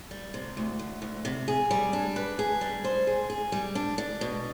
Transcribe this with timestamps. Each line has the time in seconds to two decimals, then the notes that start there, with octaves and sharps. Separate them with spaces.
0.11 G3
0.34 C3
0.57 D2
0.79 D2
1.02 D2
1.25 C3
1.48 G#4
1.71 G3
1.93 D4
2.16 B4
2.39 G#4
2.61 G3
2.84 C5
3.07 G#4
3.30 G#4
3.52 G3
3.75 D4
3.98 D4
4.21 B2